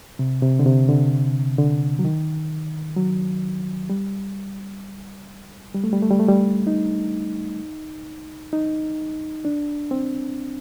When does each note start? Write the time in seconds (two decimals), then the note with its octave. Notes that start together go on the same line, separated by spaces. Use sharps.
0.19 C3
0.42 C3
0.59 D3
0.66 C3
0.89 D3
1.59 D3
1.99 F#3
2.05 D#3
2.97 F#3
3.90 G3
5.75 G3
5.84 A3
5.93 G3
6.02 A3
6.11 G3
6.20 A3
6.29 G3
6.67 D#4
8.53 D#4
9.45 D4
9.91 C4